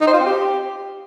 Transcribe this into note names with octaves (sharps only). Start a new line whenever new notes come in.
D#4
C5
F4
C4
G4